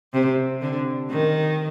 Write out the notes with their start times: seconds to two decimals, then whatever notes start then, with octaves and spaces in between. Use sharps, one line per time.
0.14 C3
0.61 D3
1.11 D#3